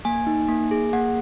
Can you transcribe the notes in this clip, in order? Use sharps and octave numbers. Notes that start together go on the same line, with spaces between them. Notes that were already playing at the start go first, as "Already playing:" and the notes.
A#3 G#5
D#4
A#3
G#4
A#3 F#5